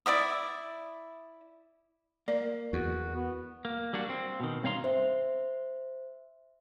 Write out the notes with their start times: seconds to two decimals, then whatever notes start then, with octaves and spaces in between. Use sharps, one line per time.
0.06 E4 D5 E5 D#6
2.28 A#3 D5
2.73 E2 F#4
3.15 B3
3.65 A#3
3.93 G3 A#3 D4 F#4
4.09 C4
4.40 B2 D#3
4.63 G2 C4 C#5 F5 A#5 C6
4.84 C5 E5